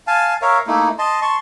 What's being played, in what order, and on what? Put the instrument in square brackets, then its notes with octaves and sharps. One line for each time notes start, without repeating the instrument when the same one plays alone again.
[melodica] F5 G#5 A5
A#4 C#5 E5 F5
A3 A#3 D#4 E4
D#5 A5 C6
A5 C6 C#6